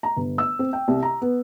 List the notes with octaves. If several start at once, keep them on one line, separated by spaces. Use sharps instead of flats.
A#5
G1
E6
C4
G5
C2
A#5
B3